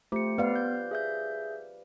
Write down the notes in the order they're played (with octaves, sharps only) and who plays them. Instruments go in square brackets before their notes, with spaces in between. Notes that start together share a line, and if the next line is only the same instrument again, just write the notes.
[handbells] A3 C#7 [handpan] F4 G4 C5
[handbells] B3 [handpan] B4 D5 F5
[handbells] G6
G#4 E5 G6